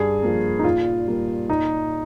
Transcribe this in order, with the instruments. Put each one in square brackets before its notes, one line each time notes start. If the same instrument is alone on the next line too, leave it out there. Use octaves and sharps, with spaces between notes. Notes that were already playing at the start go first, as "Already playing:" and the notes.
Already playing: [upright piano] G2 G#4
F3 A#3
D#4
A#2 F4
G3 A#3
A#2 D#4